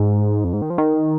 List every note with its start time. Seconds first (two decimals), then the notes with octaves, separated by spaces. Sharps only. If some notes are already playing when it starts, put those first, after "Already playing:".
Already playing: G#2
0.44 F2
0.53 G#2
0.62 D#3
0.70 F3
0.78 D#3